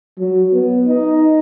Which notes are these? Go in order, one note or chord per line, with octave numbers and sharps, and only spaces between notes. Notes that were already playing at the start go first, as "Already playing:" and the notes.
F#3
B3
D#4